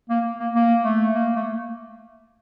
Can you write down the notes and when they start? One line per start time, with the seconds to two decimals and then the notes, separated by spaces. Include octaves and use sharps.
0.10 A#3
0.39 A#3
0.55 A#3
0.84 A3
1.13 A#3
1.36 A3